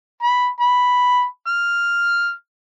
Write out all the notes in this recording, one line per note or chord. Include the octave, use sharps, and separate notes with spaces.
B5
B5
F6